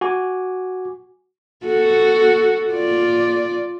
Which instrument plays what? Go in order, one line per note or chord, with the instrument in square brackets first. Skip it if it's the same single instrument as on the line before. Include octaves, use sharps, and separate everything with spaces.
[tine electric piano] F#4 G#5 D6
[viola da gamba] F#4 A4
F4 D5